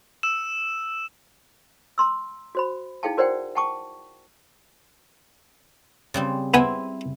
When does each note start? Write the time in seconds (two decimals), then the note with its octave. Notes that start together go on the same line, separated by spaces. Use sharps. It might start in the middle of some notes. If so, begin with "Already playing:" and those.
0.23 E6 E7
1.98 A#5 C6 E6
2.55 F#4 C5 B5
3.03 D#4 E4 G#4 F5 G5 A5
3.17 F#4 A#4 C5 D5 F#5 G5
3.55 F#5 G5 A5 C#6 D6
6.14 C#3 G3 C4
6.54 B3 C4 E4 G#5